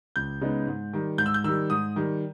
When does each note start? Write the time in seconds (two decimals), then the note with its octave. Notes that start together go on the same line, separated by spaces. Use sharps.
0.16 C#2 G6
0.41 C#3 G#3 B3 D#4
0.67 G#2
0.93 D#3 G3
1.18 G#2 G6
1.26 E6
1.34 G6
1.44 D#3 G3 E6
1.70 G#2 D#6
1.96 D#3 G3